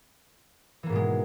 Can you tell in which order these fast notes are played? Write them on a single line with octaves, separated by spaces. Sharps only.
E3 A#3 G#2 B2 G#3